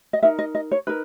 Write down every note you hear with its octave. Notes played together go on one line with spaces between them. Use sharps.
D#5
D#4 A#4 E5
D#5
D#5
C#5
D#4 A#4 B4